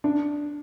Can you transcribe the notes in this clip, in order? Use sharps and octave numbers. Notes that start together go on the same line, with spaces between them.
D4